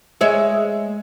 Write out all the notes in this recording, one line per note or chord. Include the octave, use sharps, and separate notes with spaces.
G#3 C#5 E5